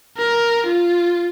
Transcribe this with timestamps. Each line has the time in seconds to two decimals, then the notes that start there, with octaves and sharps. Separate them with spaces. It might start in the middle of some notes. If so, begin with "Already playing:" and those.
0.18 A#4
0.66 F4